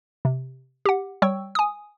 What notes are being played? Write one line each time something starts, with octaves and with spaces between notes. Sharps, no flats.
C3
G4 F#5
G3 C#5 G5 C#6 E6
G#5 D#6